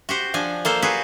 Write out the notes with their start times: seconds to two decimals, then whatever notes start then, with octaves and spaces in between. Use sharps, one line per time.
0.09 F#4 G4 C5
0.34 F3 D4 G#5
0.65 A#3 A4 C5
0.82 F#4 G#4 B4 C5